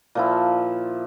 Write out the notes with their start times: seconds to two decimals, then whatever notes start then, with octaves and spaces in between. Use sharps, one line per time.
0.15 A#2 F3 E4